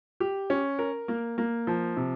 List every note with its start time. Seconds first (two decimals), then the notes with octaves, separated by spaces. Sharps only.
0.20 G4
0.50 C#4
0.79 A#4
1.08 A#3
1.38 A#3
1.67 F3
1.97 C3